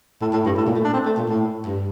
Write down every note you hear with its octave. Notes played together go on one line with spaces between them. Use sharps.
A2
A2
G2
A2
A#2
A3
D4
C4
A3
A#2
A2
G2